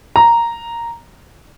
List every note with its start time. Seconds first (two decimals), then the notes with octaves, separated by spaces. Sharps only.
0.16 A#5